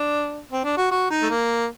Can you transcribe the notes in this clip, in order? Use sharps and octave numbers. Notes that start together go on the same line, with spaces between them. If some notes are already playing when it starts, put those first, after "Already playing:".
Already playing: D4
C4
D4
F#4
F#4
D#4
A3
A#3